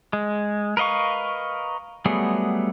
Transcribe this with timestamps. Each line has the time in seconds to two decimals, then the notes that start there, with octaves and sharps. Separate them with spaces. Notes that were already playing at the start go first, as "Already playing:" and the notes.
0.13 G#3
0.77 A#4 B4 D#5 F5 C#6
2.06 F#3 G3 A3 B3 G#4